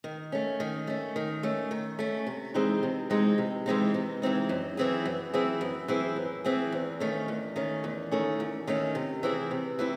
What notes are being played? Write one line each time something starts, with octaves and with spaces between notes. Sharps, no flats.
D#3
A3 C#4
D#3
A3 C#4
D#3
A3 C#4
D#3
A3 C#4
C3
E3 G#3 C4 D#4
C3
E3 G#3 C4 D#4
C3
E3 G#3 C4 D#4
C3
E3 G#3 C4 D#4
F#2
E3 C4 E4 G#4
F#2
E3 C4 E4 G#4
F#2
E3 C4 E4 G#4
F#2
E3 C4 E4 G#4
E2
D#3 A3 C#4
E2
D#3 A3 C#4
E2
D#3 A3 C#4
E2
D#3 A3 C#4
C3
E3 C4 E4 G#4
C3
E3 C4 E4